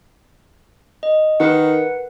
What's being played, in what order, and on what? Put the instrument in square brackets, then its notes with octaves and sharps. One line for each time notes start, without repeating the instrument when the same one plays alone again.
[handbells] D#5
[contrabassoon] D#3 [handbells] A#4 B4 F#5